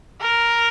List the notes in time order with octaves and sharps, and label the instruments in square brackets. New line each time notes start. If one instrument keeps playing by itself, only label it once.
[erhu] A#4